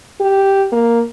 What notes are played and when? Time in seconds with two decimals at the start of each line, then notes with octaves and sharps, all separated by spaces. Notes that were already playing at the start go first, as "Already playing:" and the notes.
0.20 G4
0.72 A#3